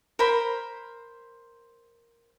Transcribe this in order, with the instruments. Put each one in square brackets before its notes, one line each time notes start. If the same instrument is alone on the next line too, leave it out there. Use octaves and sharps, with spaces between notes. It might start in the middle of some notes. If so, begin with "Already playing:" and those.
[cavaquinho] A#4 C5 B5